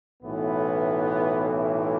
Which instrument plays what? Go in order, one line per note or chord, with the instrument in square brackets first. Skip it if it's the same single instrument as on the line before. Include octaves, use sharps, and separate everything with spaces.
[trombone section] B1 A2 E3 B3